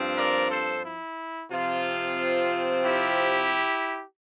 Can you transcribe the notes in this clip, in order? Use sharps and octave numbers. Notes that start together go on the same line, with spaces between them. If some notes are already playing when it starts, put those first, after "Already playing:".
Already playing: G2 F3 C4
A#4 D5
A4 C5
E4
C3 F3 C4 F4
E4 G4